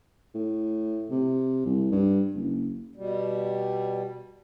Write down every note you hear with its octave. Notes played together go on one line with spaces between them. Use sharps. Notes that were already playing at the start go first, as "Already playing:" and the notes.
A2
C3
C2
G2
F#1
B2 G3